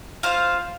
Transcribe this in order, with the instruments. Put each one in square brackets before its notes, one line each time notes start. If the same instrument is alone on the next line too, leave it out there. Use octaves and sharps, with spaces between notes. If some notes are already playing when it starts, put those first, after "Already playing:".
[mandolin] F4 C5 F5